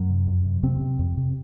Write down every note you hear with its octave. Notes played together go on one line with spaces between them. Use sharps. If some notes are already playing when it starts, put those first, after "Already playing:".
Already playing: F#2 F#3
C3
F2
C3
F2 C3 C4
C3
F2
C3